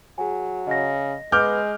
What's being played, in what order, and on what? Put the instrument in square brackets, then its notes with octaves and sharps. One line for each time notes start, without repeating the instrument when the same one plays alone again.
[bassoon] F#3 [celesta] G#4 G#5
[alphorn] C#3 [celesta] D#5 A#6
[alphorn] G#3 [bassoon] B3 [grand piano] D6 F6 G6